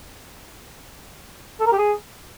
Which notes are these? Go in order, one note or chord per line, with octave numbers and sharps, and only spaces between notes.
A4
A#4
G4
G#4